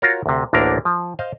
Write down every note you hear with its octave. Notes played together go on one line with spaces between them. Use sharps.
F4 F#4 A#4 C#5
D2 C3
A1 D2 D3 A#3 D4 A#4
F3
C5 D#5 F5